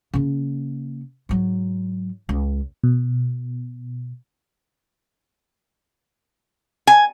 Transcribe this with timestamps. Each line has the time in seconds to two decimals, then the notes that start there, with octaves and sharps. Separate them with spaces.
0.14 C#3 A#3
1.29 G#2 F#3
2.29 C#2
2.84 B2
6.87 G#5